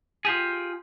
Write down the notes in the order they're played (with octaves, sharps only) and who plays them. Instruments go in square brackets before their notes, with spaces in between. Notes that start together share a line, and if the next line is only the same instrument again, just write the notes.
[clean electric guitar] F4 G4 G#4